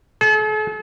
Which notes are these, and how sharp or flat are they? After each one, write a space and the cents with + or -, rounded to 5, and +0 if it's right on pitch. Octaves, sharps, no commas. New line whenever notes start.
A4 -45